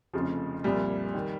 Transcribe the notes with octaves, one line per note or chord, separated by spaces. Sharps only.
F1 F2 C#3 F3
C2 A#2 F3 G3
D#3